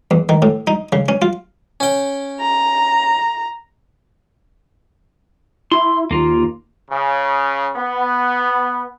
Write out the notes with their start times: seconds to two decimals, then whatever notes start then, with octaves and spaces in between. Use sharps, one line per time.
0.11 E2
0.29 D#3
0.42 A2
0.67 D#4
0.92 C#3
1.08 C#4
1.22 F4
1.80 C#4 G5
2.40 A#5
5.71 E4 C6
6.11 D#2 A#3 F4
6.90 C#3
7.76 B3